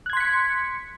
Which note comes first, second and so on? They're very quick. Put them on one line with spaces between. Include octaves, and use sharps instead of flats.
F#6 G#6 C6 B6 C#7